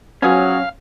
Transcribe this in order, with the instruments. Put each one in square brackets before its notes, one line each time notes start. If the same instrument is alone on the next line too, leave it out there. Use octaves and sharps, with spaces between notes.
[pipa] F3 B3 G#4 [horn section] F#3 [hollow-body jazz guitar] C#4 [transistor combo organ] F5